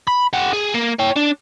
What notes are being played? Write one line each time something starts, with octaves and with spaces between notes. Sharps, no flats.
B5
G4 F#5
G#4
A#3
C#5 G5
D4